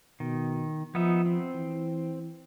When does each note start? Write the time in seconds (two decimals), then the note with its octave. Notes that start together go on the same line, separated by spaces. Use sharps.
0.20 B2 D#3
0.95 F3 B3 D#4 E5
1.26 C4
1.55 E3